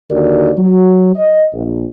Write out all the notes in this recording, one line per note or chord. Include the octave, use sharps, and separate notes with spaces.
D#2 D3 F#4 A#4 D5
F#3
D#5
A#1